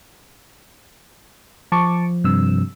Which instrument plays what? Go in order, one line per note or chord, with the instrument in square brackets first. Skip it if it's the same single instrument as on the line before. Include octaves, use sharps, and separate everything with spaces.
[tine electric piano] F3 [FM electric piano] A5 C#6 D6
[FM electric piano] G2 C3 E6